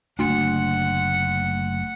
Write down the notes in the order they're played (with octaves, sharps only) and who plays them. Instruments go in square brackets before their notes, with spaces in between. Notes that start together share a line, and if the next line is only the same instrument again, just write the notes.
[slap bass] F#1 D3 D4 [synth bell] A3 C6 [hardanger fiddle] F#5